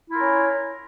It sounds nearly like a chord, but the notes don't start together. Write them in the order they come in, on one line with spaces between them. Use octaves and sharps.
E4 F4 A#4 C#4 C#5